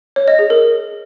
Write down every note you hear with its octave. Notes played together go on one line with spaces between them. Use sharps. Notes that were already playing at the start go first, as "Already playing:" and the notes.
C#5
D#5
G#4
A#4